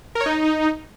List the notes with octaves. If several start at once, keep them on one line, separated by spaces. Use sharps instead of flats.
A#4
C#5
D#4